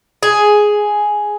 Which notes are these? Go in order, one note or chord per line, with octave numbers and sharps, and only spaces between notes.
G#4